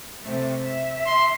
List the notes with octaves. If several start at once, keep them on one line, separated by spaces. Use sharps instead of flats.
C3 A3
E5
C6